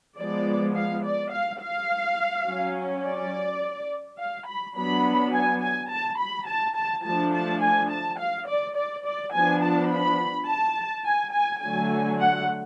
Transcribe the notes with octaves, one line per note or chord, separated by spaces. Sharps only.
F3 G#3 B3 D5
F5
D5
F5
F5
F#3 C#4
D5
F5
B5
F#3 B3 D4 B5
G#5
G#5
A5
B5
A5
A5
F3 A3 D4 A5
A5
G#5
A5
F5
D5
D5
D5
F3 B3 D4 G#5
A5
B5
A5
G#5
G#5
D3 F#3 A3 G#5
F#5